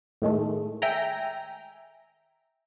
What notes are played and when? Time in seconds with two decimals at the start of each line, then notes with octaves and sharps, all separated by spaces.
0.22 A2 D#3 G#3 A3
0.82 E5 G5 G#5 A#5